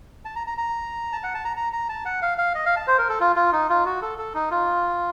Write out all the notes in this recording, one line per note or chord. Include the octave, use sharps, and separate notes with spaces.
A5
A#5
A#5
A#5
A5
F#5
A5
A#5
A#5
A#5
A5
F#5
F5
F5
D#5
F5
A5
C5
A#4
A4
F4
F4
D#4
F4
F#4
A4
A4
D#4
F4